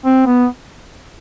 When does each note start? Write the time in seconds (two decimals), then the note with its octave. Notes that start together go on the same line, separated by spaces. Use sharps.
0.06 C4
0.27 B3